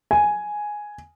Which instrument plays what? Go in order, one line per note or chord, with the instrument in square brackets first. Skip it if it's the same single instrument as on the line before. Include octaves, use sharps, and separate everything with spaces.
[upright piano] G#5